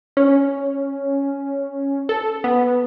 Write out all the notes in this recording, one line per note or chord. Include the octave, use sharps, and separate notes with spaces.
C#4
A4
B3